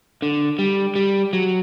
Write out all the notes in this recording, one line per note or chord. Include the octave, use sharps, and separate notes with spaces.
D3
G3
G3
F#3